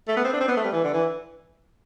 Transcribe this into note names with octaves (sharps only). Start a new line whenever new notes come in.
A3
B3
C4
D4
C4
B3
A3
G3
E3
D3
E3